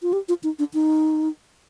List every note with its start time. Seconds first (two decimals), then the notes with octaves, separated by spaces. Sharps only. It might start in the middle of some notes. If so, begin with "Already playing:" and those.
0.02 F4
0.13 G4
0.28 F4
0.43 D#4
0.59 D4
0.74 D#4